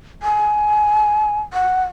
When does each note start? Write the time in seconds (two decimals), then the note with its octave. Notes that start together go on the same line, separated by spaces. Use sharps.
0.23 G#5
1.53 F#5